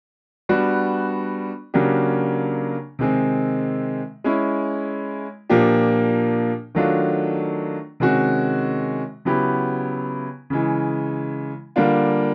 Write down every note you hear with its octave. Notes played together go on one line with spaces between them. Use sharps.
G3 B3 D4 F#4
C#3 F#3 A#3 D4 G4
C3 D#3 G#3 C4
G#3 C#4 E4
A#2 F3 A#3 D4 G4
D#3 F#3 A3 D4 F4
C3 D#3 G#3 C#4 F#4
C#3 F#3 B3 E4 G4
C#3 E3 G#3
D3 G3 A#3 D4 F4